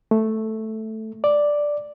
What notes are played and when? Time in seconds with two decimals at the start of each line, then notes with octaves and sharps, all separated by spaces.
0.11 A3
1.24 D5